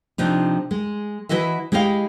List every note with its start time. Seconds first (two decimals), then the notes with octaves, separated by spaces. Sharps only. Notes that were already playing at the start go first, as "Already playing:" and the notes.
0.18 C3 F3 D4 D#4
0.71 G#3
1.29 E3 E4 F#4 D#5 E5
1.72 G#3 E4 G4 D#5 F5